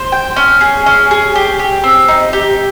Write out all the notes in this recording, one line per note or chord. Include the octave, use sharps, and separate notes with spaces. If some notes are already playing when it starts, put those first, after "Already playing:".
Already playing: C5
G5
C#4
G#4
C#4
G#4
G4
G4
C4
D#4
G4